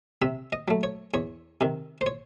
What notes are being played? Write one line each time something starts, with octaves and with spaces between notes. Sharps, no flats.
C3 E5
D#5
F#3 A3
C#5
E2 C#5
C3 D#3
C5
C#5